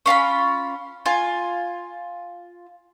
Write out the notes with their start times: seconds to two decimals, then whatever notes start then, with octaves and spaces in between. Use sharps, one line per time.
0.06 C#4 F4 A#5 B5
1.06 F4 G#5